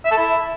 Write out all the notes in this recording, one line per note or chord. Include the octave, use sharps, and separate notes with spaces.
E5
A4
E4